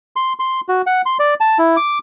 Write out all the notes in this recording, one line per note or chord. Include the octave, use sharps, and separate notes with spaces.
C6
C6
F#4
F#5
C6
D5
A5
E4
D6